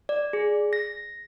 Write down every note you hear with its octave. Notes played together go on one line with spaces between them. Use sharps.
D5
G#4
A#6